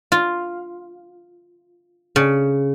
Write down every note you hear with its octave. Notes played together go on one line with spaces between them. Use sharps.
F4
C#3